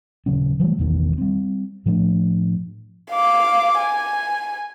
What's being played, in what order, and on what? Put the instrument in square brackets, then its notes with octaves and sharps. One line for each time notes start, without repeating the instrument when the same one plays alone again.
[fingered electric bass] D#1 C#3 F#3 C#4
E3 F#3 G3 A3
A1 E2 B2 D#3
G3 C4
A2 F3 A3 D4
[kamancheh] F5 D6
G#5